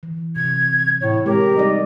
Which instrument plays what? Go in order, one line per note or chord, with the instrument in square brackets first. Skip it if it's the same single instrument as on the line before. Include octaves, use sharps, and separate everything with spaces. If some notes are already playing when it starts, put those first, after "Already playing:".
[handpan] E3
[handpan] C3 [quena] G#6
[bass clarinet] A2 [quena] C#5
[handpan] G#3 C4 [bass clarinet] G4 [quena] A#4
[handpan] G3 D#4 D5 [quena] D#5